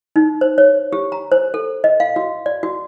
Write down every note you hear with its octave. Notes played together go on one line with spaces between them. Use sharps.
D#4
C5
C#5
G4
A#5
C5
A4
D#5
F5
F#4
D5
F#4